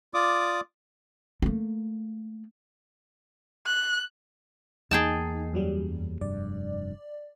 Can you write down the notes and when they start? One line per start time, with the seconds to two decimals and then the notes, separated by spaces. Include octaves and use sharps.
0.14 F4 D5 D6 D#6
1.42 A3 A#3
3.66 F#6
4.91 E2 A#3 D#4 G#4 G5 A5
5.53 F#2 F#3 G3
6.21 F1 G2 D5